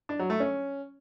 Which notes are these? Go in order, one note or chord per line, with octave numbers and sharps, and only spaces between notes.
D4
F#3
A3
C#4